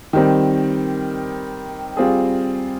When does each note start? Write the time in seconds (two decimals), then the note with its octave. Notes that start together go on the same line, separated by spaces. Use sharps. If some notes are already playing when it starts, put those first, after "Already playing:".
0.13 D#3 G3 C4
1.97 G3 C4 F4 G#4